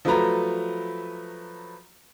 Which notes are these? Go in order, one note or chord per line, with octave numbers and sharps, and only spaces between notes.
F3 F#3 A3 B4 A#5